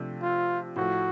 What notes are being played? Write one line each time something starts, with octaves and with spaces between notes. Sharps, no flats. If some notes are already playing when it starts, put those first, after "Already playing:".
Already playing: C3 F3 A3 D4
F4
A2 F3 A3 F#4